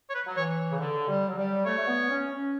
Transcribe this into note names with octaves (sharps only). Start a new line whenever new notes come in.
C#5
B4
F#3
E3 C#5
C#3
D3
G3
F#3
G3
A3 C#5
A3
B3
C#4
C#4